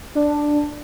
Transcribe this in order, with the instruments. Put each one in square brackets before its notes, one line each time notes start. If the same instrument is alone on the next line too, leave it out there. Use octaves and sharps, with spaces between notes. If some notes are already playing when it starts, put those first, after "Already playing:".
[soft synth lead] D4